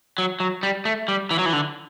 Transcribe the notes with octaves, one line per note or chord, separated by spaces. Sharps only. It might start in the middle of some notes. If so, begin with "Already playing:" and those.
F#3
F#3
G3
A3
G3
E3
F#3
E3
D3